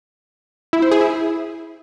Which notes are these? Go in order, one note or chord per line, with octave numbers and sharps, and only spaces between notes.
E4
C5
G#4
E4